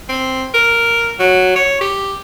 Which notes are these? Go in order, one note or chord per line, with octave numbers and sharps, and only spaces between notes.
C4
A#4
F#3
C#5
G4